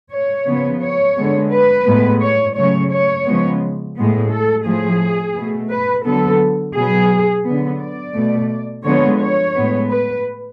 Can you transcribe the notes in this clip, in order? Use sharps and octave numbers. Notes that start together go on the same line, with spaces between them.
C#5
C#3 F3 B3
C#5
D3 G#3 B3
B4
A2 G#3 B3
C#5
C#3 F#3 A3 C#5
C#5
C#3 F3 G#3 B3
A2 G#3 B3
A4
A2 F3 A3 G#4
B2 A3
B4
D3 F#3 B3 A4
B2 F#3 B3 G#4
D3 F#3 B3
D5
B2 A3
D3 F3 G#3 B3 C#5
C#5
A2 G#3 B3
B4